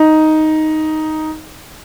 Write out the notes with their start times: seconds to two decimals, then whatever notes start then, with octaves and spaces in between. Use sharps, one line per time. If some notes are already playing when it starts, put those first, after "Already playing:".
Already playing: D#4